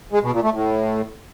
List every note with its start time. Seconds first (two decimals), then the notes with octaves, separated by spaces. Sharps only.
0.12 G#3
0.23 B2
0.33 A#2
0.43 A3
0.53 A2